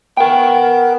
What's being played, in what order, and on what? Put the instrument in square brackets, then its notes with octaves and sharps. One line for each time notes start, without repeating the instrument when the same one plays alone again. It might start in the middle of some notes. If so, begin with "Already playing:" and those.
[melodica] B3 [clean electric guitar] A#4 G5